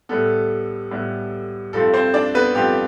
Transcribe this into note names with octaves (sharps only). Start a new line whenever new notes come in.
A2 G3 B3 A4
A2 G3 B3
G2 F3 A3 C4 A4
C4 C5
D4 D5
B3 B4
G2 F3 A3 C4 G4